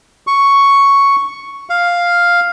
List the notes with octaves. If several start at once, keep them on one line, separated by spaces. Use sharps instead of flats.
C#6
F5